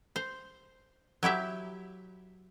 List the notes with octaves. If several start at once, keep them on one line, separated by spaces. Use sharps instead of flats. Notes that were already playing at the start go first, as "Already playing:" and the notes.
C5
F#3 E4 G4 E5